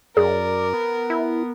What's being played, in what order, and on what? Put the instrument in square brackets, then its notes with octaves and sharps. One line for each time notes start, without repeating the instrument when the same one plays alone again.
[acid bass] F#2 [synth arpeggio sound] G#4 [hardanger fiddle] A#4 [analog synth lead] D5
[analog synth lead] B3
[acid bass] E4